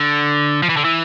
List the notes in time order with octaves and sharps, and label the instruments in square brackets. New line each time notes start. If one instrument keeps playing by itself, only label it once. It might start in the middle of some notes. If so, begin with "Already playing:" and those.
Already playing: [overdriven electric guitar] D3
F3
E3
D3
E3